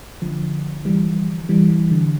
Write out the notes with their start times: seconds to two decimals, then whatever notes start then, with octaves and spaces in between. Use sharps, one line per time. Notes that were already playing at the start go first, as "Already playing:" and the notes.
0.22 D3 F3
0.85 E3 G3
1.49 E3 G3
1.70 E3
1.91 D3